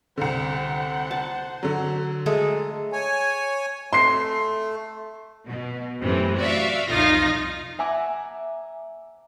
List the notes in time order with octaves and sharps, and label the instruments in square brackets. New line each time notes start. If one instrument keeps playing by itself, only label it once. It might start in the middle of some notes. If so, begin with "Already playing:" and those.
[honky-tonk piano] C2 D3 [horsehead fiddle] C5 F#5
[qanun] A5
[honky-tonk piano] D3 F#3
[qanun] G#3 A3 A4
[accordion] C#5 G#5
[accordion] A3 [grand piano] C6 C7
[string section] B2
F#2 A2 C3 E3
F#4 D5 E5 F5
C2 F2 D#4 F4 F5 A#6
[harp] E5 F#5 G#5 A#5 D6